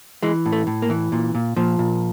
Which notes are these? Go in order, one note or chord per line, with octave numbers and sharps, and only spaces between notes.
E3 G#3
A2
A3
A2
A#3
E3
A#2
A#2
A#2 F3
A#2